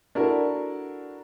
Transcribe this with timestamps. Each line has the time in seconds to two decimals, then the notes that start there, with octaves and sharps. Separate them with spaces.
0.15 D4 E4 F#4 A4 A#4